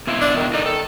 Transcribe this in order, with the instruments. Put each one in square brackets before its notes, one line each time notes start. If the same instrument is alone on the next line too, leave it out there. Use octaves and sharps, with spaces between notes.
[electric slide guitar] B2 E4 F4
[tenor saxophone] D4
D#3
[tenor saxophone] D#4 [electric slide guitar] A4 D5 D#5
[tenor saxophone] D#3 [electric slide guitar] A4